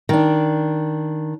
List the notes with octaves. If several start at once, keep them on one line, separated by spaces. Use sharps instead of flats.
D#3 D4